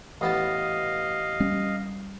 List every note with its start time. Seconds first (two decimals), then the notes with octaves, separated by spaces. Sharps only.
0.21 A1 B3 D#5 F5 A5
1.40 G3 C#4